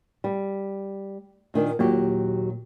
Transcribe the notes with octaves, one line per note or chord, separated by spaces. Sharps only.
G3
A#2 D#3 D4
D#2 A#2 F#3 G4